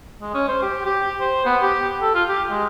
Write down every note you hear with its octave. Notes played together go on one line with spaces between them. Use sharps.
G#3
C#4
C5
G4
G4
C5
B3
G4
A4
F4
G4
G#3